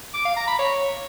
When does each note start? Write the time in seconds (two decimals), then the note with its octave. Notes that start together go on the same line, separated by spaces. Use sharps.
0.14 D6
0.25 F5
0.36 A#5
0.48 B5
0.59 C#5